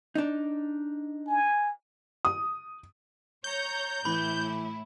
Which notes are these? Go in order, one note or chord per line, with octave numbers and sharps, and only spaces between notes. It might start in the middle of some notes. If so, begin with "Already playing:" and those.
D4 D#4
G#5
D#6
C#5 A#5 G6
A2 E3 E4 B5